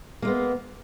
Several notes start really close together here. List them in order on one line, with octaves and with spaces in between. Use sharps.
A#3 G#3 B3